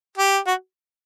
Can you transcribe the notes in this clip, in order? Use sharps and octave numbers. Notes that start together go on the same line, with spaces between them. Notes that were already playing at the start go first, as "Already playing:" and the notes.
G4
F#4